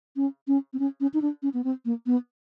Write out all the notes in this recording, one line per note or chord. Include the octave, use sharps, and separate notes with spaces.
C#4
C#4
C4
C#4
C#4
D#4
D4
C#4
B3
C4
A#3
B3